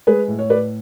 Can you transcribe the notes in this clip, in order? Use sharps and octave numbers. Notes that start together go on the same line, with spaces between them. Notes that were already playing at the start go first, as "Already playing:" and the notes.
G#3 G#4 B4
A2
C#5
A2 B4 D5